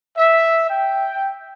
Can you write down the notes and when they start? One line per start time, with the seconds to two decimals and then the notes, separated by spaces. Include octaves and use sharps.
0.16 E5
0.69 G5